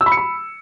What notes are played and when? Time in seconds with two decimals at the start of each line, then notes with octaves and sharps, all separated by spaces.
0.01 E6
0.06 B5
0.12 C#7
0.17 B5